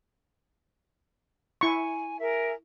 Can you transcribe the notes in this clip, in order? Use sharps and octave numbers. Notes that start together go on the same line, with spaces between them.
E4 G#5 C#6
G#4 A#4 E5